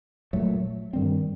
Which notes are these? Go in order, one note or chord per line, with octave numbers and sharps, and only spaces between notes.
A#2 F#3 A3
G2 D#3 G3 C4